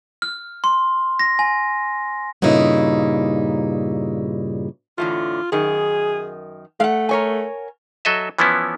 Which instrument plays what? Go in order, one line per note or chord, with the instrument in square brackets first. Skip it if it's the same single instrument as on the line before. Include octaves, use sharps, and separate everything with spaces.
[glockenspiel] F6
C6
A#6
G#5
[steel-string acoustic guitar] G2 A#2 C#3 D#4 E4
[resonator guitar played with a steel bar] E2 A2 D3 [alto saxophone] F4
[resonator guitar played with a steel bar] F#2 D#3 [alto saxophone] G#4
[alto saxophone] A3 [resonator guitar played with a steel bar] F5 F#5
[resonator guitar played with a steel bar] A#4 C#5 G#5
[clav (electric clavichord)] F#3 A4 D#5 E5
E3 F3 B3 C#4 E4